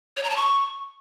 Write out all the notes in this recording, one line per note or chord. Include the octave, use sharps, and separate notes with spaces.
C#5
A#5
A5
C#6